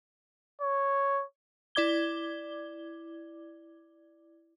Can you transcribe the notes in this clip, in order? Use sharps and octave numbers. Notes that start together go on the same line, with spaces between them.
C#5
E4 D5 D6 G#6 G7